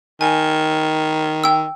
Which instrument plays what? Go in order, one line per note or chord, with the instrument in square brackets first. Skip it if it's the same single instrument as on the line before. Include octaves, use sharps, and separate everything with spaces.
[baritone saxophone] D#3 [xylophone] G#5
[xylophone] G5 E6